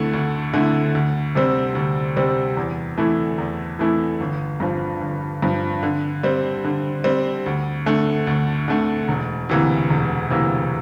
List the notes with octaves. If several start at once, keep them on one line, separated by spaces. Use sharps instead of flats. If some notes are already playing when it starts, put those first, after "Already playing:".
Already playing: D2 D3 A3 E4
D2
D3 A3 E4
D2
C3 G3 C4
D2
C3 G3 C4
E2
E3 A3 E4
E2
E3 A3 E4
G1
G2 F3
G1
G2 F3
D3
G3 C4
D3
G3 C4
D2
D3 A3
D2
D3 A3
E1
D2 C3 E3 A#3
E1
D2 C3 E3 A#3